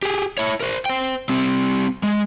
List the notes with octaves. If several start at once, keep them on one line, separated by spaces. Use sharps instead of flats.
G4 G#4
E4 C#5
A#4 C5
C5 G5
G3 C4
G#3